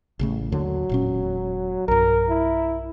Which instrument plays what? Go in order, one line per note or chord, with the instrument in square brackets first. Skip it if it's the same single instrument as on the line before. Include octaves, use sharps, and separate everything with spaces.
[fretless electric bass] A1 C#3 A3
[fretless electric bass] D#2 D3 [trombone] F#3
[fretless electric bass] E1 A#2 C#4
[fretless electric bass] B1 G2 [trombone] A#4
[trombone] E4